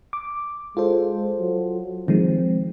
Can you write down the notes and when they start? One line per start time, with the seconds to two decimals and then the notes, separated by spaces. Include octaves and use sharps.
0.13 D6
0.77 G#3 F4 A4 C5
1.40 F#3
2.08 D#3 F3 G#3 C4